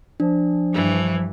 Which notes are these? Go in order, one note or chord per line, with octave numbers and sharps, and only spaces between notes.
F3 D4
G2 E3